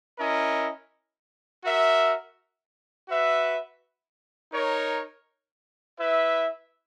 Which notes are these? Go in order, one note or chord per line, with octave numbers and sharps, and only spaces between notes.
C#4 E4 A#4 D#5
F#4 A#4 E5
F#4 B4 E5
D#4 A#4 C#5
E4 B4 E5